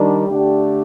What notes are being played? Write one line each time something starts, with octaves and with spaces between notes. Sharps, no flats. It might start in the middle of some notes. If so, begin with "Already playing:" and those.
Already playing: D#3 G3 D4
D3 A3 D4 G4